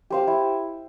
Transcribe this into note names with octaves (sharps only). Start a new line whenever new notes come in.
G4 C5 F5
E4